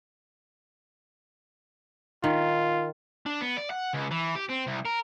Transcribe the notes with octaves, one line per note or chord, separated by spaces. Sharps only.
D#3 F4
D4
B3
D5
F#5
C#2
E3
G4
C4
C2
A#4